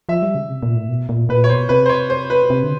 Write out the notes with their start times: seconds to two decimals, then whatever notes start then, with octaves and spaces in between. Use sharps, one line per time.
0.09 F3 E5
0.22 G3
0.35 C#3
0.49 C3
0.63 A#2
0.76 A2
0.89 B2
1.09 A#2
1.29 A#2 B4
1.44 C#5
1.49 B2 C5
1.69 C3 B4
1.86 C5
1.89 C#5
2.10 C5
2.30 B4
2.50 C3
2.63 D3